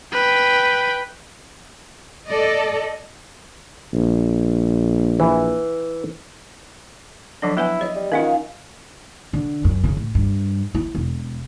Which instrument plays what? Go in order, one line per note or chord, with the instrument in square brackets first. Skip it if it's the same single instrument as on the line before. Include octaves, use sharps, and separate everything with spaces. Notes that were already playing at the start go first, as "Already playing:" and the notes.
[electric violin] B4 G5
[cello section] A4 D5 D#5
[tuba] A#1
[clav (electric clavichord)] E3
[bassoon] D3 [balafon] F3 F#3 D4
[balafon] B3 B4 G#5 [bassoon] E4
[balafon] C#5 E5 [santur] D#5
[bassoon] G3
[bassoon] D#3 [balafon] C#4 D#4 F4 [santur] F5 F#5 G#5
[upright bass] D3
F#2
C#3
A2
G2
E4
E1